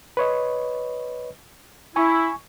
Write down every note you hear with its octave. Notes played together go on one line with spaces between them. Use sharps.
B4 C#5 D#5
E4 G#5 C#6